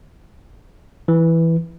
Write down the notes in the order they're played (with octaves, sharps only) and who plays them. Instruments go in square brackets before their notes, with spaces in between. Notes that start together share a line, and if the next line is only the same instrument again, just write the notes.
[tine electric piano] E3